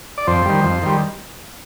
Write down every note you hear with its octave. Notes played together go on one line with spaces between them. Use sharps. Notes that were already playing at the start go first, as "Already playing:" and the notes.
D5
F2 C5
D#3 G3
F2
D#3 G3